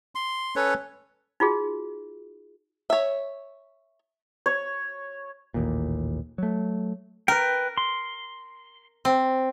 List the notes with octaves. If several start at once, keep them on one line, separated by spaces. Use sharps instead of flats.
C6
C#4 A4 B4 C#5
D#4 F4 F#4 G#4
C#5 E5
C#5
A1 D#2 A#2
F#3 A3
A#4 B4 G5
C6
C4